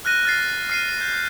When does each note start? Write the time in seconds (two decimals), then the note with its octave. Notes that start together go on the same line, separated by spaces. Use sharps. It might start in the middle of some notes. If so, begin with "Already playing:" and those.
0.05 F6 F#6 A#6 D#7
0.25 F6 A6 C7
0.70 F6 C7 D#7
1.01 G6